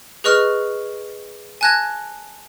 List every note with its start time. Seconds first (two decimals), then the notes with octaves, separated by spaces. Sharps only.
0.24 G#4 B4 D#5 C#6 F6
1.61 G#5 A5 F#6 G#6 A#6